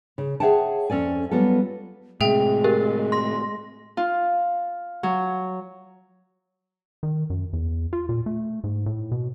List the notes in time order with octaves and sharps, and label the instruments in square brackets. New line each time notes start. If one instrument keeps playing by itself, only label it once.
[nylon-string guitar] C#3
G#4 C#5 E5 F#5 G5 A5
F2 C#4 A4 D5 G#5
F#3 G3 B3 F4 A4
[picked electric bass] A2 C3 [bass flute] G#3 [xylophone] G#4 E5 G5
[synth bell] G4 A#4
C6 A#6
[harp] F4
F#3
[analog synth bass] D#3
F#2
E2
F4
A#2
A3
G#2
A2
B2